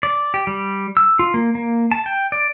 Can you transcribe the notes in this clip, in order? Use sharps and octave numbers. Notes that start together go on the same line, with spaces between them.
D5
G4
G3
E6
F4
A#3
A#3
A5
G5
D5